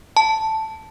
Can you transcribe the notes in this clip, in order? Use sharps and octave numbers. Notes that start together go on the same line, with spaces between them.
A5